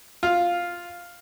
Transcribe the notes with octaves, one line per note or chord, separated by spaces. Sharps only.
F4